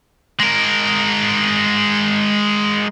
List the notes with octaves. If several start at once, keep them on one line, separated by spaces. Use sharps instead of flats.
G#3 A#4